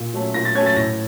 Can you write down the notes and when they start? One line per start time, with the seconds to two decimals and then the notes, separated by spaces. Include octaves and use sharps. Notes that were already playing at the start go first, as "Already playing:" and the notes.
Already playing: A#2
0.14 F#3 A3 C#4
0.34 A#2 A#6
0.45 A6
0.55 F#3 A3 C#4 G#6
0.66 A6
0.76 A2 A#6